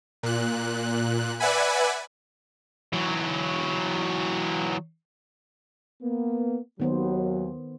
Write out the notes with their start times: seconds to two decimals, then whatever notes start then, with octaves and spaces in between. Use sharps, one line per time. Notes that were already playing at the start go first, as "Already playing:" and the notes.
0.23 A#2 F#6
1.40 B4 D5 E5 F#5 G#5 B5
2.93 E3 F#3
6.02 A#3 B3
6.80 D#2 D#3 F#3 B3 C5